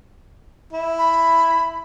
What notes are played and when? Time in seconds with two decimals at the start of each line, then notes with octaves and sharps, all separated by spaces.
0.73 E4
0.99 B5